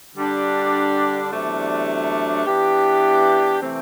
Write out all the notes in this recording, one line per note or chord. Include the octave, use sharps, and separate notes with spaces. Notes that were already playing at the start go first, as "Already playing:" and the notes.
D3 G3 D4 G4
E2 C3 F#3 A3 D4
E3 B3 D4 G4
C3 E3 A3 C4